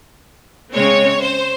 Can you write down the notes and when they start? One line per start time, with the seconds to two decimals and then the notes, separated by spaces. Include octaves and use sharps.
0.73 C#3 G#3 C4 C#5
1.21 C5